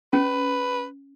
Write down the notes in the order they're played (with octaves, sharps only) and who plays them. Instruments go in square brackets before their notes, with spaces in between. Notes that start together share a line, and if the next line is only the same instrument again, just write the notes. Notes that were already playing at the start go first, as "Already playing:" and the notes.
[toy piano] C#4 [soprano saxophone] B4